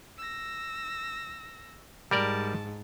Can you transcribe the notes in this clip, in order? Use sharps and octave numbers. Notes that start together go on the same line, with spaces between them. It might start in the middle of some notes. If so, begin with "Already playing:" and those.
E6 A#6
G#2 G3 A#4 D5 A5